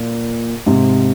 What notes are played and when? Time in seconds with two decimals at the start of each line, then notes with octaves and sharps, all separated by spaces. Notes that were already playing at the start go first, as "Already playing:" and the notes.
Already playing: A#2
0.66 G#2 C3